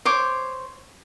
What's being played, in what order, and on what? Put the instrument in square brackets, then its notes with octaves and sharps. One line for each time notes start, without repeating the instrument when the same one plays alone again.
[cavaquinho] C5 C#5 D6